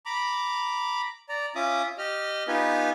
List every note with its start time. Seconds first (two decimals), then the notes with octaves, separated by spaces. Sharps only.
0.06 A#5 B5 D6
1.29 D5 A#5
1.55 C#4 F4 E5 D6 D#6
1.98 G4 D#5 F6
2.48 B3 D#4 F4 G4 B4 G#5